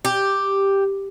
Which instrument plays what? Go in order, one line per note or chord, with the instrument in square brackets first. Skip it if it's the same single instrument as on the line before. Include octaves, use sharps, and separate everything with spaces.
[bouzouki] G4